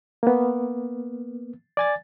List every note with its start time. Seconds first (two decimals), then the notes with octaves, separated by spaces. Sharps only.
0.23 A#3 B3
1.77 D5 G#5 A6